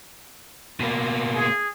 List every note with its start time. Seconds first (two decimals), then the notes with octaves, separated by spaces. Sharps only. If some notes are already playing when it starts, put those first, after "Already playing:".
0.81 B2 A#3
1.34 G#4